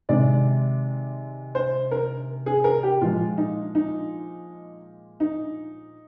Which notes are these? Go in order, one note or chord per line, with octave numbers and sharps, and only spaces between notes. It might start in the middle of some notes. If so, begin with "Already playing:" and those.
C3 D#3 G#3 D5
C5
A#4
G#4
A#4
G4
A#2 F3 G#3 F4
D#4
D#4
D#4